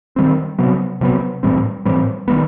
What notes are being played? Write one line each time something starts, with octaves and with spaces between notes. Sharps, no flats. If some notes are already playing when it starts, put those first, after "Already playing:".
D#3 G3 C4
C3 F#3 B3
C3 F#3 B3
A2 E3 G3 C4
A2 E3 G3 C4
D#3 G3 B3